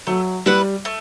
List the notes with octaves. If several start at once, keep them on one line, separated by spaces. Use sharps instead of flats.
F#3 A3
G3 E4 B4 F#5
A3